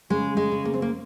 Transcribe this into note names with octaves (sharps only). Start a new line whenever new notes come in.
C#3 G#3
G#3
C#3
A#3
C4
A#3